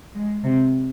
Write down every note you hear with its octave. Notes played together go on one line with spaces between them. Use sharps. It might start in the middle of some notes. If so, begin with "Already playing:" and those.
G#3
C3